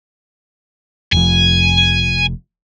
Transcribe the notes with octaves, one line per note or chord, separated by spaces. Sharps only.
F1 F2 G#5